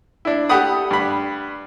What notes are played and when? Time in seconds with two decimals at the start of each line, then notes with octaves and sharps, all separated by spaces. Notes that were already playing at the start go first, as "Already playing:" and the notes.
0.25 D4 E4
0.49 G4 A4 F#5 B5 D#6
0.91 G2 B5